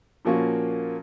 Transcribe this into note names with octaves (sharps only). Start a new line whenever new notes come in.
A#2 F3 A#3 C#4 F#4